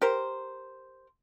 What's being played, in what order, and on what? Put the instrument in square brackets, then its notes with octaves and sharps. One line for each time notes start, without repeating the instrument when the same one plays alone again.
[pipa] G4 A#4 C5